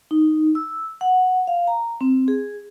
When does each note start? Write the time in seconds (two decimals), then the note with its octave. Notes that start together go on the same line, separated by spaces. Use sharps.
0.11 D#4
0.55 E6
1.01 F#5
1.47 F5
1.67 A#5
2.01 C4
2.28 G#4